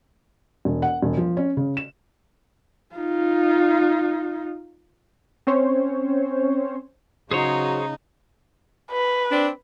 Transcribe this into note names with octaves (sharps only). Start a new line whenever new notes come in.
E1
F#5
E1
F3
C#4
C#3
E7
D#4 F4
C4 C#4 C5 C#5
C#3 F#3 D#4 G#4 C5 C#5
B4
C4 D4